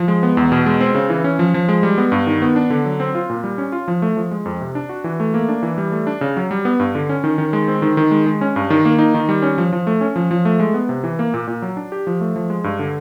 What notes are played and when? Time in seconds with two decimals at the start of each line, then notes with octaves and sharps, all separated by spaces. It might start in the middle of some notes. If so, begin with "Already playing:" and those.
Already playing: F3
0.08 G#3
0.23 B3
0.37 E2
0.52 B2
0.66 G#3
0.80 C4
0.95 C#3
1.10 E3
1.24 C#4
1.39 F3
1.54 F3
1.69 G#3
1.83 G3
1.98 B3
2.12 G2
2.27 D#3
2.42 B3
2.56 D4
2.70 D3
2.85 F#3
3.00 C4
3.15 F4
3.30 A#2
3.44 G3
3.58 C#4
3.72 F4
3.88 F3
4.02 A3
4.17 F3
4.31 G#3
4.45 F2
4.61 C3
4.75 D4
4.89 F#4
5.04 E3
5.20 A3
5.34 A#3
5.49 D4
5.63 E3
5.78 G3
5.92 A3
6.07 D4
6.21 C#3
6.37 F#3
6.51 G3
6.65 B3
6.80 G2
6.95 D3
7.09 C#4
7.24 D#3
7.38 D#3
7.53 G#3
7.68 C4
7.82 D#3
7.97 D#3
8.11 G#3
8.26 G#3
8.41 C#4
8.56 G2
8.70 D#3
8.85 A#3
8.99 D#4
9.14 D#3
9.29 G3
9.42 C#4
9.58 F3
9.73 F3
9.87 A3
10.01 C#4
10.16 F3
10.31 F3
10.45 A3
10.60 G#3
10.74 B3
10.89 C3
11.04 E3
11.19 A#3
11.34 A#2
11.48 A#2
11.62 F#3
11.77 D4
11.92 G4
12.07 F3
12.21 A3
12.36 F3
12.50 G#3
12.64 G2
12.79 D3